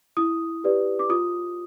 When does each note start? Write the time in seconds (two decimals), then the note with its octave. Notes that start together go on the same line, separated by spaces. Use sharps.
0.17 E4 D#6
0.64 G4 B4 D5
0.99 D6
1.09 F4 D#6